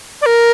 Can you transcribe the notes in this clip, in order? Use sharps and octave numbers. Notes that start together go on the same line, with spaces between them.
D5
A#4